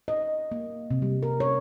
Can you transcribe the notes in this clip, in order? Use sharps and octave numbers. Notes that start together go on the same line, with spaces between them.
D#5
A#3
C3
G3
A#4
C#5